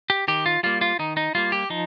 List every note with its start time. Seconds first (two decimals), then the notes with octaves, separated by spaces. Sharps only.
0.10 G4
0.28 D#3 G4
0.46 F4
0.63 G3 A#3 F4
0.81 F4
0.99 D#3 D#4
1.17 D#4
1.35 G3 A#3 F4
1.52 G4
1.70 F3 D#4